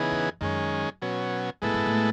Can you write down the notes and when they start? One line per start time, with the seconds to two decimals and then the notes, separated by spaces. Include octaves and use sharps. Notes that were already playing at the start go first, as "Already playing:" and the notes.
Already playing: C#3 E3 B3 D#4 G#4
0.11 E2
0.41 F#2 D#3 G#3 C#4
1.02 B2 F#3 C#4
1.62 A2 G#3 B3 E4 A4
1.74 G#2
1.86 A2